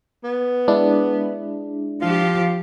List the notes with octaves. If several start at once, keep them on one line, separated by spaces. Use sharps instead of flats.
B3
G#3 D4 E4
F3 F4 G4